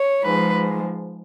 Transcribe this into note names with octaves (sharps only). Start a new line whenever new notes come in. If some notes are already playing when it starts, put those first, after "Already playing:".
Already playing: C#5
G#2 F3 G#3 B4